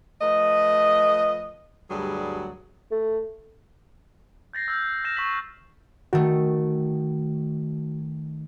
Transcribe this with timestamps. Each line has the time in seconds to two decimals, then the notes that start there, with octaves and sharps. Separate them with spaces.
0.22 F3 A3 B4 D#5
1.90 D2 G2 F#3 G3 G#4 D5
2.91 A3
4.53 G6 A6 A#6 C7
4.68 E6 F6 G6
5.04 F6 A#6 E7
5.16 C#6 E6 A#6 B6 F#7
6.13 D#3 A3 F#4